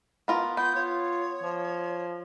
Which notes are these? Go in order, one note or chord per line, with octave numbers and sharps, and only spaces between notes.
B3 F4 A#4
B3 F4 G6
F4 C#5
F3